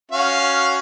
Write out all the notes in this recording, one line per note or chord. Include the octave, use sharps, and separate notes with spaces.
C#4 F#4 F5